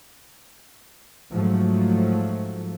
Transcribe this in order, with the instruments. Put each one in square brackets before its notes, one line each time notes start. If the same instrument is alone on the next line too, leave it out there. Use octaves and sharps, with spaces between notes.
[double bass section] G#2 F3 F#3 A3